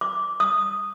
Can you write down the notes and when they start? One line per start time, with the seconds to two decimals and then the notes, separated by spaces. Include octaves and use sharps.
0.01 D6
0.40 D#6